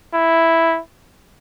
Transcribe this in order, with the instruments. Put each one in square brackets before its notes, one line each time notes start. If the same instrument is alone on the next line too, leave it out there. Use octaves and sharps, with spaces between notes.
[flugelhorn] E4